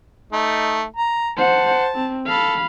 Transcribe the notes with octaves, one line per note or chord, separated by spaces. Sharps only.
A3 D#4
A#5
C5 F#5 A5
C4
A4 F5 B5